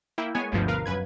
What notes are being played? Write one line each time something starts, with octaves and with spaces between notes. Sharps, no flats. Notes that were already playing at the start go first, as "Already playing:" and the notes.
A#3 E4 G5
G#3 B3 C#5 G#5
G1 D2 G2 B2 F3
A#4 B4 F5
F#2 B4 G#6